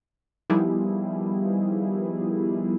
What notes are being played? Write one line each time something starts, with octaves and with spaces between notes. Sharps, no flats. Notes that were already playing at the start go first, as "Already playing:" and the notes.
D#3 F3 G3 B3 E4 G#4